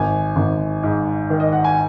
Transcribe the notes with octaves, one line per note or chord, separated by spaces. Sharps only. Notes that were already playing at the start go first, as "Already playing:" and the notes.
Already playing: G#1 G#5
G#1
G#2
D#3
D#5
F#5
G#5